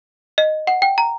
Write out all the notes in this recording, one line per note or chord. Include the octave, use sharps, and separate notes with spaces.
D#5
F#5
G5
A#5